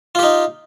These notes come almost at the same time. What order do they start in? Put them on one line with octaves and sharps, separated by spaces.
F4 G4 D#4